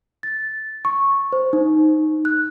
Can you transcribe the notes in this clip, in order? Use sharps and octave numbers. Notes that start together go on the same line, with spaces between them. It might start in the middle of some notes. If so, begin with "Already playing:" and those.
A6
C#6
C5
D#4
F#6